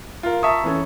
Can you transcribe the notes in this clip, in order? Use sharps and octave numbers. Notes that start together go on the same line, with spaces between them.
F4 A#4
E5 A5 A#5 C#6 D#6
E3 C#4 A4